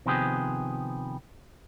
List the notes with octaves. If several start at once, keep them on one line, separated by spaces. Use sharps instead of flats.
C3 D#3 F3 B3 G4 G#4